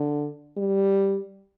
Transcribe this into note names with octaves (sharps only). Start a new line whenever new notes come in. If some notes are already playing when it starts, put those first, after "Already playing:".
Already playing: D3
G3